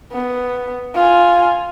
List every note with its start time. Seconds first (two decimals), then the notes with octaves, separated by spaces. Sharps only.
0.13 B3
0.95 F4 G#5